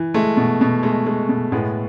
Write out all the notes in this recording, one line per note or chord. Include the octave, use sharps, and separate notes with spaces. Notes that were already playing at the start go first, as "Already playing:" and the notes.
Already playing: E3
G#3 A3
B2
B2
G#3 A3
G#3
B2
A2 G#3 B3